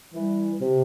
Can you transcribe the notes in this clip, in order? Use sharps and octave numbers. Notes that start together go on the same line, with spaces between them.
E3 G3
C3